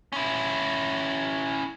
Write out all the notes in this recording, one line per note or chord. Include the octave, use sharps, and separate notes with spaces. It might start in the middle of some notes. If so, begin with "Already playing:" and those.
C#4 E4